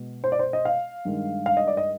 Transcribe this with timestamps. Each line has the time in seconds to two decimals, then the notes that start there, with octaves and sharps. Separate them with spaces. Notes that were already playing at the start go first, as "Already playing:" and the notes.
Already playing: B2 G#3 B3
0.24 C5
0.32 D5
0.39 C5
0.53 D#5
0.65 F5
1.05 G2 D#3 G#3
1.46 F5
1.57 D#5
1.67 D5
1.77 D#5